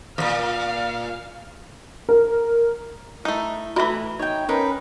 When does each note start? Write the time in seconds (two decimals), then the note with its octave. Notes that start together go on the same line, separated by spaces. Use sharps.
0.18 E2 A#2 F5
2.09 A#4
3.25 A3 D#4 E4
3.76 D#3 E3 A3 E4 F#4 E5 A#5 B5
4.19 D#4 C#5 G5
4.49 C#4 D#4 A#4 B4